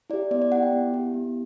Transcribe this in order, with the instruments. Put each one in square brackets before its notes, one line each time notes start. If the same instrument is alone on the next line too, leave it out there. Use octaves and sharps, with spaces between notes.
[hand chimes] E4 G4 D5
B3 D5
D5
E4 G4 F#5
G5
B3
E4 G4
B3